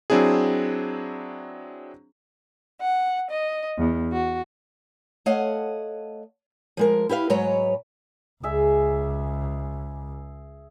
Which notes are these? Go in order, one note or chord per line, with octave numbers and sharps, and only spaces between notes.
F#3 C4 D4 E4 G#4
F#5
D#5
E2
F#4
A3 C#5 D#5 F5 F#5
F3 G#3 A#4
E4 G4 B4 F5
G#2 F#3 G#3 B4 C#5 A#5
C#2 G#4 E5